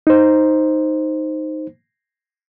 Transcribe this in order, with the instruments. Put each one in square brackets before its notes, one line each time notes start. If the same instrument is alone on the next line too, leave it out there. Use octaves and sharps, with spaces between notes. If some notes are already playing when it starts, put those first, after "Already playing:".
[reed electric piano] D#4 C5